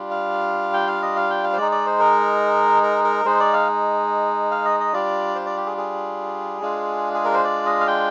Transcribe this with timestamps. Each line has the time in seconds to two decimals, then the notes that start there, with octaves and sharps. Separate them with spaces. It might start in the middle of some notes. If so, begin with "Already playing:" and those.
Already playing: G3 D4 F4
0.11 F5
0.73 G5
0.87 F5
1.02 D#5
1.16 F5
1.30 G5
1.44 F5
1.53 C5
1.57 G#3 D#4 D5
1.72 D5
1.86 C5
2.00 A#4
2.83 A#4
3.04 A#4
3.25 G#3 D#4 C5
3.40 D5
3.53 F5
4.51 F5
4.65 D#5
4.80 D#5
4.93 G3 D4 F4 D5
5.35 C5
5.46 D5
5.57 G4
5.66 G#4
5.77 G#4
6.62 G#3 D4 F4
7.14 G#4
7.25 A#4
7.34 C5
7.44 D5
7.66 D#5
7.81 F5
7.87 G5